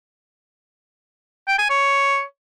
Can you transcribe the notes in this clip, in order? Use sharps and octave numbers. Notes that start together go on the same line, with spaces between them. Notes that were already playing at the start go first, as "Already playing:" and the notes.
G5
G#5
C#5